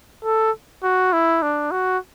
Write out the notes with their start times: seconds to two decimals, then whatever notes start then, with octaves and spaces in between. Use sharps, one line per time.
0.25 A4
0.83 F#4
1.13 E4
1.42 D4
1.71 F#4